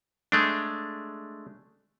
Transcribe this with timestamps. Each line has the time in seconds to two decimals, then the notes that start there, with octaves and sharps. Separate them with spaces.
0.32 G#3 A3 D4